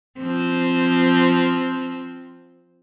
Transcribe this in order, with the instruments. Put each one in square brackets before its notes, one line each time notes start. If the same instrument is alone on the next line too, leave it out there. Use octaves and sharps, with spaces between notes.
[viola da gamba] F3 C4